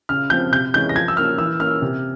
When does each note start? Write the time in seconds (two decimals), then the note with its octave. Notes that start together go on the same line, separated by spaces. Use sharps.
0.09 C#3 F6
0.30 F3 C4 G6
0.52 C3 G6
0.74 E3 G#3 C#4 G6
0.89 A#6
0.95 F3 G#6
1.08 E6
1.17 A#3 C#4 F6
1.38 E3 E6
1.60 A#3 C#4 F6
1.82 C3